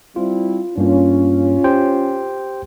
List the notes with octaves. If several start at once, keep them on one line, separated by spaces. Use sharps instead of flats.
G3 C4 E4 F4
G2 A#3 C#4 F4
G4 C5 G5